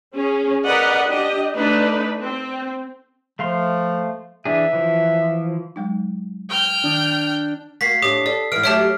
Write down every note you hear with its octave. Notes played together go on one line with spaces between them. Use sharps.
C#4 G#4
A#4 B4 D5 D#5 F#5
D4 G4 D#5
A3 D4 D#4 B4
C4
F3 A3 F5 C6
E3 D4 G#4 E5
E3 F3
F#3 G#3 D#4
G5 F6 G6
D#3 D4 D#6
A#3 F#4 B6 C7
A2 D4 G4 D#6
A4 D5
G#2 E3 F6 D7
F#3 A3 G4 C#5 E5 A5 D7